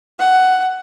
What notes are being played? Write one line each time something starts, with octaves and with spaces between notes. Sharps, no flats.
F#5